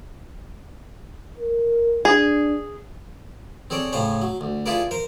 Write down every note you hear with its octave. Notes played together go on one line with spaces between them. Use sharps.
A#4
D4 G#4
C4 G#4 A4 C#5 D5
A2 C#3 G#4 C5 C#5
F#3
D2
E4 F4 G#4 A4 B4 D5
A#4 C5